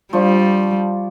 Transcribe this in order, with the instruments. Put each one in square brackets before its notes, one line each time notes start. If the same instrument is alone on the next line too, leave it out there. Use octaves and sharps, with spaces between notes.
[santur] F3 D4 C#6 [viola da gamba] G3